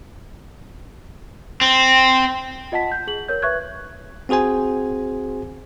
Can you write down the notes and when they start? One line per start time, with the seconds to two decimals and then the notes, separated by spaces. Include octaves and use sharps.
1.61 C4
2.72 F4 D#5 F#5 A5 B6
2.92 G6
3.07 G#4 F#7
3.28 A#4 C#5 G6
3.42 B4 E5 C#6 F#6 G#6
4.29 C4 F#4 G#4 C5 G#5